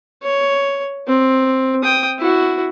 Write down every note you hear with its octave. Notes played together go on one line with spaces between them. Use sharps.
C#5
C4
G5 D#6
E4 F#4